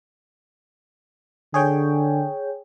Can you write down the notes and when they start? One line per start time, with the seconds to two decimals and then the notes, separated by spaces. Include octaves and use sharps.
1.54 D3 G#4 C#5 G5